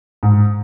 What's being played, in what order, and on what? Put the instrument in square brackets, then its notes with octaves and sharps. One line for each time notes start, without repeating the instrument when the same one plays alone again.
[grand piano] G#2